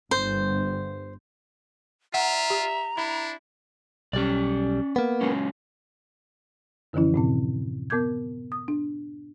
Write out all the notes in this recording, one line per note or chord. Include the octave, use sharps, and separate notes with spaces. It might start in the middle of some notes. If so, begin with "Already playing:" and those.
G1 C5
F4 E5 F#5 A#5
G4
D4 E4 B5
B1 G3 C#4 D5
A#3 B3
F#3 G#3 C#4
F#2 D3 E3 F3 C#4 E4
A2 C3 C4
B3 A#4 D6 G6 G#6
D#6
D4